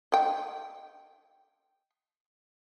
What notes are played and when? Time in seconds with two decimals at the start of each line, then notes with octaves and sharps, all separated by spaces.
0.12 D#5 G5